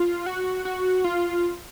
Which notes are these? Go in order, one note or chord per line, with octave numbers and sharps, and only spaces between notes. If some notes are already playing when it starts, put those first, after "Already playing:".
Already playing: F4
F#4
F#4
F4